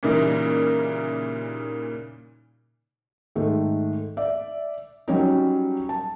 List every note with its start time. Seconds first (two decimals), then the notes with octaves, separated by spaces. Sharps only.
0.03 A#2 C#3 E3 G3 A#3 D#4
3.36 G#2 D#3 A3
4.17 D5 E5
5.08 F#3 G3 C#4 D#4
5.89 A5